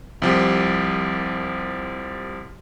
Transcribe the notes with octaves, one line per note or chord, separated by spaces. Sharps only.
C2 F3 G4